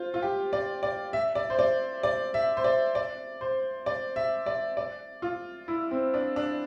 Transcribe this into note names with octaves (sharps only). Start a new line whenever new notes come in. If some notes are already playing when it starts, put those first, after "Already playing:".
Already playing: F4 C5
F4
G4
D5
D5
E5
D5
C5
D5
D5
E5
C5
D5
D5
C5
D5
E5
D5
D5
F4
E4
C4
D4
D4